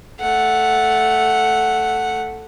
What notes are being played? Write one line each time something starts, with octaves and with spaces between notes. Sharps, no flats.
A3 F#5